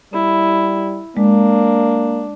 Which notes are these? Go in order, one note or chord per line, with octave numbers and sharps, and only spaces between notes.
G3 E4
G#3 A#3 D4